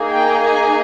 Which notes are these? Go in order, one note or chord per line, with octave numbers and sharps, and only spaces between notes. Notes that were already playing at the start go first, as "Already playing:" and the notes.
Already playing: A#3 D#4 G#4
G5
G#5